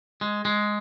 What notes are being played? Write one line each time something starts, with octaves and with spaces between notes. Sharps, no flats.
G#3
G#3